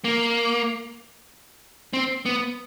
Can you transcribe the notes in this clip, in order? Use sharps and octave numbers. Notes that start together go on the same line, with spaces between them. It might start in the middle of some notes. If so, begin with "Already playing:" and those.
A#3
C4
B3